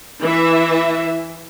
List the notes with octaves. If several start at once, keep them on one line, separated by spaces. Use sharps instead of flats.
E3 E5